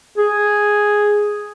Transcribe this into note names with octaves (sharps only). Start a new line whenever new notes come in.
G#4